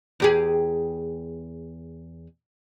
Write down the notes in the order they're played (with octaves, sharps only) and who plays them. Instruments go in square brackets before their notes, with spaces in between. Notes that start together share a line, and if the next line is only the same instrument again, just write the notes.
[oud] E2 G4 G#4